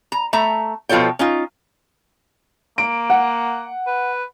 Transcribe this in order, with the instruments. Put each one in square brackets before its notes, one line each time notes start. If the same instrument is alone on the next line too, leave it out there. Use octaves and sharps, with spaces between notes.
[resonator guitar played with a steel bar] A#5
A3 E5 A#5
B2 F3 F4 A4 C#5 G5
C#4 D#4 F4
[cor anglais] A#3 [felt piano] D7
[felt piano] F#5
[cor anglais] B4